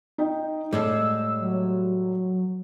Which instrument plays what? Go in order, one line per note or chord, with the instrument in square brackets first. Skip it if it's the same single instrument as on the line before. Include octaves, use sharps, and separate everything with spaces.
[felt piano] D#4 D#5 G5
[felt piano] A2 [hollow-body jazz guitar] G3 G#3 A4 [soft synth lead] E6
[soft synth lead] F#3